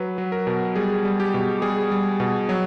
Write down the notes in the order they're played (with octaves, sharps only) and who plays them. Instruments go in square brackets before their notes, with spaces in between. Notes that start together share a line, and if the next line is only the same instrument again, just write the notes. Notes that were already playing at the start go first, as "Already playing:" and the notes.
Already playing: [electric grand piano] F#3 B4
F#3
A#4
B2
G3 G#4
G3
G4
B2
G3 G#4
G3
B2
F#3